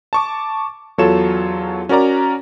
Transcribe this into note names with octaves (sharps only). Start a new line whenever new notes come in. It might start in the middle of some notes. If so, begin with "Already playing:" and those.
A5 C#6 D6
E2 F#3 F4 A4 C#5 E7
C#4 F#4 A#4 D5 A#5